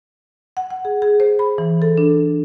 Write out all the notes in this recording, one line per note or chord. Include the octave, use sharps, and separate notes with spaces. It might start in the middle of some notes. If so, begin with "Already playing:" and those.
F#5
F#5
G#4
G#4
C5
B5
E3
A4
D4